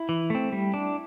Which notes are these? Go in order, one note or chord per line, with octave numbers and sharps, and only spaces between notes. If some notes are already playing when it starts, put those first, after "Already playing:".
Already playing: E4
E3
A3 C4
G3
D4